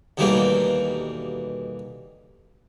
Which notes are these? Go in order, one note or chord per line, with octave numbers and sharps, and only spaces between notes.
D#2 B2 E3 G3 A3 A#3